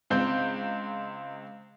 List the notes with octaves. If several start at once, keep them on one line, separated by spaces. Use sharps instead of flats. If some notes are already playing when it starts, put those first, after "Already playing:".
C#2 C4 G6